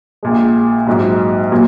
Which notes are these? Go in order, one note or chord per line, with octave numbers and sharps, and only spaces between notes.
A#1 A#2 G#3
A#1 G#2 F#3
A#2 F#3 A#3